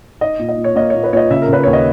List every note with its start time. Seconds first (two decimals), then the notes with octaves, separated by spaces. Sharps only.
0.21 D#4 D#5
0.39 A#2
0.49 D#5
0.57 A#2
0.64 C#5
0.75 A#3 D#5
0.90 A#2 C#5
1.04 B4
1.13 A#2 C#5
1.17 D#5
1.30 C#3 E5
1.42 A#4
1.48 C#3 B4
1.63 D#2 C#5
1.73 D#5